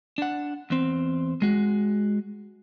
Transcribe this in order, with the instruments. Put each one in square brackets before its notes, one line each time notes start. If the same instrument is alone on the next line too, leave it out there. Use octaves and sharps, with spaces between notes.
[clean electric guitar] D4 F#5
E2 C4
G#3 F#4